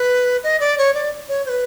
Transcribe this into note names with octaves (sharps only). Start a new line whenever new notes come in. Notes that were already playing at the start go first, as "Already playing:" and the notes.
Already playing: B4
D#5
D5
C#5
D5
C#5
C5
B4